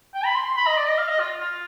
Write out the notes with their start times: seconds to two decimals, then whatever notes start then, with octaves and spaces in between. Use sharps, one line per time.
0.15 G5
0.25 B5
0.35 C6
0.46 C6
0.57 B5
0.67 D#5
0.77 D5
0.88 D#5
0.98 F5
1.09 D#5
1.20 F4
1.40 F4